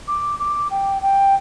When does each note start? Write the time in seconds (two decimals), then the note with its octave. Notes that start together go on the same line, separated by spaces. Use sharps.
0.08 D6
0.40 D6
0.70 G5
1.02 G5